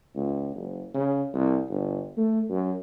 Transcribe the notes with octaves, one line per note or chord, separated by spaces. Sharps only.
C#2
F#1
C#3
C2
G1
A3
F#2